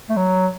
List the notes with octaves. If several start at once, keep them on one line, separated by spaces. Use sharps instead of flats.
A3
F#3